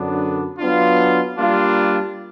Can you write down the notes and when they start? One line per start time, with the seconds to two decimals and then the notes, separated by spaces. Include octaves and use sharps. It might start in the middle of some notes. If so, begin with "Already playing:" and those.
Already playing: F#2 D3 F#3 B3 D4
0.59 F#3 B3 D4 F4
1.38 G3 A#3 D4 F4